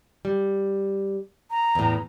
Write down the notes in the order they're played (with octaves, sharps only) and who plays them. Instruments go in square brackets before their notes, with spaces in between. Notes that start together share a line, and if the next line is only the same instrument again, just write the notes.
[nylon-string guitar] G3
[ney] A#5
[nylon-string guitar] E2 A2